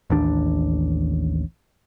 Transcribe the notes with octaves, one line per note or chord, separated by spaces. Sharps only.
A1 D#2 D4